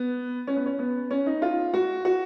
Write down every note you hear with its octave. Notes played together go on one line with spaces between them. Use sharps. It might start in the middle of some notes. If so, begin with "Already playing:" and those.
Already playing: B3
C#4
B3
C#4
B3
C#4
D#4
F4
F#4
F#4